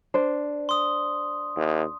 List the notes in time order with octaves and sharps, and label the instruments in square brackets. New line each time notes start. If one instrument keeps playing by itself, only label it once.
[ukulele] D4 C5
[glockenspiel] C6 D#6
[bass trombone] D#2